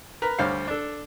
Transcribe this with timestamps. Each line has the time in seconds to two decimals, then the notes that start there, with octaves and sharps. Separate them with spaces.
0.22 A#4 B4 A#5
0.39 D2 G3 C5 C#5 F5
0.67 D4 A4